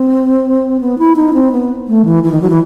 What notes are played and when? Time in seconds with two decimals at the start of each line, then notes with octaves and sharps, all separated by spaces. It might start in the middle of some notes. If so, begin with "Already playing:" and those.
Already playing: C4
0.81 B3
0.99 E4
1.16 D#4
1.34 C4
1.52 B3
1.88 A3
2.05 E3
2.24 E3
2.32 D#3
2.42 F#3
2.50 E3